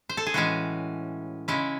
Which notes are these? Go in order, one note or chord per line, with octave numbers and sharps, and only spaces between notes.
C5
A4
G#4
A2 E3 G#3 C#4 F#4
C#3 G#3 C#4 E4